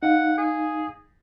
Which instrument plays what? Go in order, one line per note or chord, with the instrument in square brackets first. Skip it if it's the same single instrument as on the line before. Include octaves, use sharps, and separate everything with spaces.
[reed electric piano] D#4 F5 [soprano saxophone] F#5
[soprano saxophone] G#4